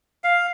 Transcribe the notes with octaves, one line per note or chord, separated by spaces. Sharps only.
F5